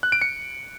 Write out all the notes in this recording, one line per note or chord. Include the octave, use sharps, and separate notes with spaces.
F#6
D7
C#7